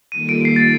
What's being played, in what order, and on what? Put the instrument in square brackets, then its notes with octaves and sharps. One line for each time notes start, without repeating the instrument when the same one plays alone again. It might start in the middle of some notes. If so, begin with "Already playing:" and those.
[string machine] D#3 G3 A#3 F4 A4 [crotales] D#7
[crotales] D7
C7
A6